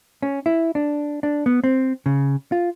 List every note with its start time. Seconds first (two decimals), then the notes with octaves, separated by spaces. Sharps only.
0.22 C#4
0.46 E4
0.75 D4
1.23 D4
1.46 B3
1.64 C4
2.06 C#3
2.52 F4